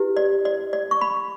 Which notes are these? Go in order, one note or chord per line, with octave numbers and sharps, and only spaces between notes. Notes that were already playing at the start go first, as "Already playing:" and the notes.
Already playing: E4 G4 B4
D5
D5
D5
C#6
B5